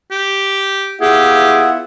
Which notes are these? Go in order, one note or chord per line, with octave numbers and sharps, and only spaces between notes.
G4
B3 E4 F4 G4 G#4 E5 F#5